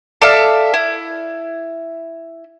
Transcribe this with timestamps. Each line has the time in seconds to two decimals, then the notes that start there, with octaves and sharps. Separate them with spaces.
0.22 A4 D5 E5 F5
0.74 E4